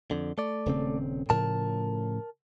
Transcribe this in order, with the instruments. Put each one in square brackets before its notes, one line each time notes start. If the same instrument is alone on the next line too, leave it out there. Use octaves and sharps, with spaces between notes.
[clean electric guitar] F2 D3
A3 D5
[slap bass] D#1 C#3 C4
[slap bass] A2 C#3 F3 [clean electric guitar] A#4 A5